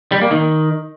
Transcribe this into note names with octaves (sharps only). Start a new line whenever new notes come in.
G3
A#3
D#3